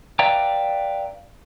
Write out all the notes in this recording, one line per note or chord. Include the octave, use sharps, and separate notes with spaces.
B4 D5 E5 F5 G5 A#5